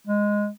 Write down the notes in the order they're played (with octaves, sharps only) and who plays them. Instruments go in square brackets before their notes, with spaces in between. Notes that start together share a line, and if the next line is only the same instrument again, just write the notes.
[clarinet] G#3